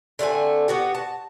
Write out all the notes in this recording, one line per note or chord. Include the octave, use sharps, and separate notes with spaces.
D3 A3 C4 G#5
B3 F#4 G4
A5